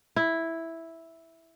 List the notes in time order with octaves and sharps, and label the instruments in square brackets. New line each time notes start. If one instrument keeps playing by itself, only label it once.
[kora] E4